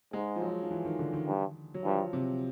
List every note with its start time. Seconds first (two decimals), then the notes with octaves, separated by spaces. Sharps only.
0.13 G#2 G#3
0.36 F3
0.42 F#3
0.63 F3
0.71 E3
0.85 D#3
0.99 D3
1.13 D#3
1.27 G2
1.74 F#3
1.84 G2 F3
2.13 C3